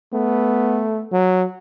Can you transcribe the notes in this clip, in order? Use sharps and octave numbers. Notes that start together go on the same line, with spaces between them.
A3 B3
F#3